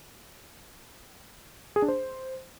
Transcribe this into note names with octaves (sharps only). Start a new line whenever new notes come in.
G#4
D4
C5